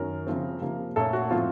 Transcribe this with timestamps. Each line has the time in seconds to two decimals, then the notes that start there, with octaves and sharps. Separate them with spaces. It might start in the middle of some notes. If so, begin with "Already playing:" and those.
Already playing: F#2 D#3 F#3 A#4
0.27 C#3 F3 C4
0.62 C3 F3 A#3
0.96 A#2 A3 C#4 A4
1.13 F#4
1.31 A2 F3 C4 F4